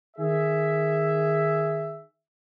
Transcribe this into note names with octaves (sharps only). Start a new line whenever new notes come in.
D#3 G#4 E5